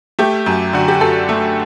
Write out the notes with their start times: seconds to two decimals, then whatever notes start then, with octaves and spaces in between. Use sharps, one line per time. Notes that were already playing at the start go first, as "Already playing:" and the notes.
0.19 A3 G4
0.46 F#2
0.73 D3 F#4
0.88 G4
1.01 F#2 A4
1.29 A3